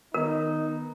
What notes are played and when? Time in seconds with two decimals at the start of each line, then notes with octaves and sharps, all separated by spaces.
0.14 D#3 B3 D#4 A#4